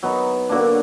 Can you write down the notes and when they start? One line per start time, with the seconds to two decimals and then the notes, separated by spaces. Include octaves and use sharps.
0.03 F#3 B3 D#4
0.49 D3 F#3 A#3 D4